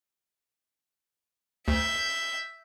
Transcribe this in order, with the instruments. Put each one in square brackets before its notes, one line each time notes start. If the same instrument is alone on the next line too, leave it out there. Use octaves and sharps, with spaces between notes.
[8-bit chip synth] D2 [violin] E5 G6